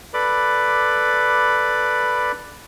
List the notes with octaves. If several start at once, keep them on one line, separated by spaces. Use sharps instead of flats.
A4 B4 D5 B5 D6